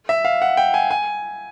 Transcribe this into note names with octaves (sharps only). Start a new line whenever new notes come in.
E5
F5
F#5
G5
G#5
G#5